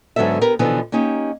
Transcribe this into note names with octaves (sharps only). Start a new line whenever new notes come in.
G#2 D3 F#3 B3 A4 E5
B3 G4 A#4 B4
B2 D3 E3 F3 B3 D#4
A#3 C#4 D#4 G4